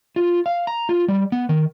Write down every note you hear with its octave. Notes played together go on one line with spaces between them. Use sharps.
F4
F5
A#5
F4
G3
B3
D#3